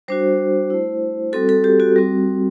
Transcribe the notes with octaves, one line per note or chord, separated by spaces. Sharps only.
G3 D4 F#4 C5
A3 E4
G3 C4 F#4 A4
A4
G4
F#4
G3 C4 F#4